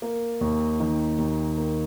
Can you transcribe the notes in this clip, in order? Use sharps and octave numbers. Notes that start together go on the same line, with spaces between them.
A#3
D#2
D#3
D#2
A#3